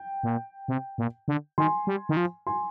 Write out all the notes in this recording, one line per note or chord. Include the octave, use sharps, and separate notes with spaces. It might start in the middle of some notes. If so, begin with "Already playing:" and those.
Already playing: G5
A#2
C3
A#2
D3
D#3 G#5 C6
G3
D#3
F3
G#5 C6